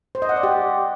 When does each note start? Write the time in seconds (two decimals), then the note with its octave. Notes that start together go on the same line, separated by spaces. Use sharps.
0.15 C5
0.22 D#5
0.29 F#5
0.36 D5
0.43 G4